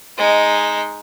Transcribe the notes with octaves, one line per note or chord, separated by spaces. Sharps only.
G#3 D#4